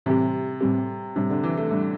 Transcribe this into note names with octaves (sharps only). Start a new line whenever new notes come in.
A2 C3 E3 G3 C4 G4
A2 E3 G3 C4 G4
A2 C3 G3 D4
D3
E3
A3
A2 G3 D4